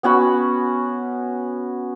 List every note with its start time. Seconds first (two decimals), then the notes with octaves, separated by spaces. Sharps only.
0.03 B3 C#4 F#4 B5